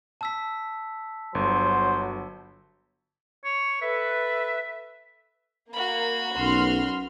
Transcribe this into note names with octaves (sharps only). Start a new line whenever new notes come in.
A5 E6 B6
G1 F#3 C5
C#5
A4 B4 E5
A#3 F#4 B5
B1 C#4 A#4 C6 F6